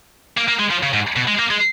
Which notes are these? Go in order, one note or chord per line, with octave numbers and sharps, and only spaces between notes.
A#3
A#3
G#3
F3
C#3
G#2
B2
G#3
A#3
G#3